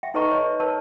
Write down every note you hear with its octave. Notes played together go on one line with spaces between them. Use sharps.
E5 G5
D#4 A4 B4 D#5 A#5 C#6
C#5 D#5
A#4 B4 C#5 A5